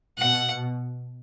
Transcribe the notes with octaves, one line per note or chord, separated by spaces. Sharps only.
B2 F#5